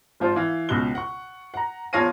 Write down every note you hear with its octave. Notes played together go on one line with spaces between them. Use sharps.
G#1 F3 F4 C5
E3 F5
C#2 B2 F#4 F#6 G7
F#5 C#6
F#5 A#5
E2 F3 C#5 F5 A#6 D#7